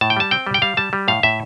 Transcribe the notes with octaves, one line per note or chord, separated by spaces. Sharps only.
A2 A5
G5
G3 A5
C4 G5
G3
G5
G3 F5
G3 A5
G3
A2 F5
A2 E5